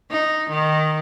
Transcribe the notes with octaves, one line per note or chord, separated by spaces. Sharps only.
D#4
D#3